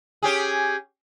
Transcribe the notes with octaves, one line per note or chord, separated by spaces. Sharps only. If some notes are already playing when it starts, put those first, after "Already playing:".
C#4 G4 G#4